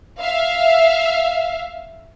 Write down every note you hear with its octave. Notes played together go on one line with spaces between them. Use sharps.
E5 F5